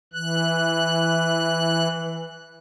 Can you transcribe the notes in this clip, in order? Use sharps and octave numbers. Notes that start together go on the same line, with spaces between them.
E3 F#6